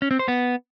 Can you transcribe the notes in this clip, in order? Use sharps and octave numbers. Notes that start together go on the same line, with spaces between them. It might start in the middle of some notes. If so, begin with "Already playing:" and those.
C#4
C4
C5
B3